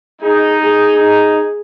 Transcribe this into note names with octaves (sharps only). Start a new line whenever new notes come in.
D#4 G#4
G#4
D#4